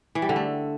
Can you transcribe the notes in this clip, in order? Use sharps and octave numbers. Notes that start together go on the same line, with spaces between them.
E3
G3
D3
A3